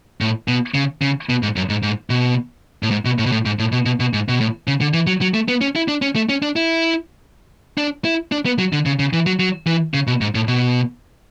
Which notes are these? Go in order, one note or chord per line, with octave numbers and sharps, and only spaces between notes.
A2
B2
C#3
C#3
B2
G#2
F#2
G#2
G#2
B2
A2
G#2
B2
A2
B2
A2
G#2
A2
B2
B2
B2
G#2
B2
A2
C#3
D3
E3
F#3
F#3
A3
B3
C#4
E4
D4
C#4
A3
C#4
D4
E4
D4
E4
D4
B3
F#3
D3
C#3
C#3
E3
F#3
F#3
E3
C#3
B2
G#2
A2
B2